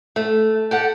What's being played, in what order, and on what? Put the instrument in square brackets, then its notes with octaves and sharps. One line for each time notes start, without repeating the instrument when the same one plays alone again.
[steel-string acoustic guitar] A3
G4 A4 F#5